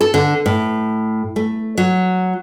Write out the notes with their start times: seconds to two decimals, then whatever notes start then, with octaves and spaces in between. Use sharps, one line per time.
0.01 A4
0.14 D3
0.46 A2
1.36 A3
1.77 F#3